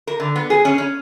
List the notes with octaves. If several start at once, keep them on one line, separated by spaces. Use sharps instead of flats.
A#4
D3
B3
G#4
C#4
C#4